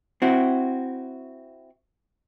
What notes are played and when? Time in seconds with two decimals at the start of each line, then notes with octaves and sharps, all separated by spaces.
0.22 C4 E4 F#4